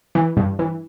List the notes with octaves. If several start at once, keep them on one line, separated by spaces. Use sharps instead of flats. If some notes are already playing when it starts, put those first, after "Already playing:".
E3
G2
E3